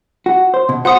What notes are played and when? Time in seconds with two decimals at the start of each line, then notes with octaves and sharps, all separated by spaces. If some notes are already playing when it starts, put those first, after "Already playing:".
0.26 F#4
0.54 C5
0.69 B2
0.85 F#4 C5 F#5 C6 D#6 C#7